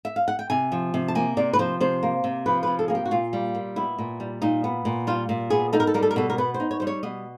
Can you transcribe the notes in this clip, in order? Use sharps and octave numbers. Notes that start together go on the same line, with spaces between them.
E5
F5
F#5
G5
C3 G#5
F3
C3
A5
A#3 G#5
C3 D5
B4
F3 C5
C3 C5
A#3
C3
F3 B4
C3 B4
A4
A#3 G#4
G4
F#4
A#2 F4
G3
A#2
B3 E4
A#2
G3
A#2 D#4
B3
A#2
G3 F4
A#2
B3 G#4
D#4 A4
A#4
A4
G3 A#4
A4
A#4
B2 A4
A#4
B3 B4
C5
D#4
C#5
G3 C5
C#5
B2 D#5